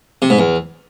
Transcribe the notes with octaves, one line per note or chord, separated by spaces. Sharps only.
C3
G#2
E2